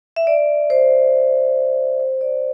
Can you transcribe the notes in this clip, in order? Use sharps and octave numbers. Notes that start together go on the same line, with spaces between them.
E5
D5
C5
C5
D5